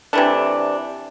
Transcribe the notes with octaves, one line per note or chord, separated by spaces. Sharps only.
C3 E3 A3 D4